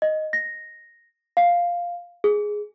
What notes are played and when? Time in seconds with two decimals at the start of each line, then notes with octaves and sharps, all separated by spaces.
0.02 D#5
0.33 A#6
1.37 F5
2.24 G#4